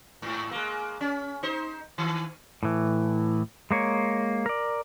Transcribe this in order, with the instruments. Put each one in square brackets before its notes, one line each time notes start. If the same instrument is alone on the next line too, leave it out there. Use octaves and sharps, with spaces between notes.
[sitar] G#2
G#3 A#3
C#4
D#4 C5
D#3
[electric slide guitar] A2 E3
G#3 A#3 C#5
A#4 D5